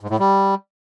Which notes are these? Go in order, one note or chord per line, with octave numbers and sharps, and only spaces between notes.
G#2
A2
G3